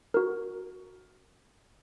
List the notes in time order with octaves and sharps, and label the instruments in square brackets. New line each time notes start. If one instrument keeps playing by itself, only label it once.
[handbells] F#4 A#4